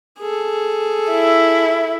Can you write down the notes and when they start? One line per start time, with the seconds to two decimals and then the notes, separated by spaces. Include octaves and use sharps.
0.19 G#4 A4
1.11 E4